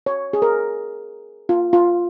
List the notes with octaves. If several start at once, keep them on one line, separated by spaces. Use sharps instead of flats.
C#5
G#4
A#4
F4
F4